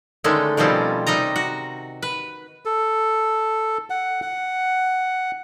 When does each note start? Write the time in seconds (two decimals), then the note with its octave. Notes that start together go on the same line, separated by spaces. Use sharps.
0.24 D3 D#3 G#3 A3 C#4
0.57 B2 D#3 F3 G3 C4 C#4
1.07 C3 G3 D#4 D#5 A#5
1.36 F#4
2.02 B4
2.65 A4
3.90 F#5
4.22 F#5